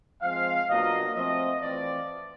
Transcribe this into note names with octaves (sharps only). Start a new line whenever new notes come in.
F3 G#3 C4 F5
B2 F#3 A#3 D4 F4 D#5
F3 A3 C4 F4 D#5
E3 A3 C4 F4 D5